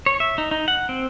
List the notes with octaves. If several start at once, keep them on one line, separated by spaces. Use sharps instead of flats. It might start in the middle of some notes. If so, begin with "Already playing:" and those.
C#5
E5
D#4
D#4
F#5
C4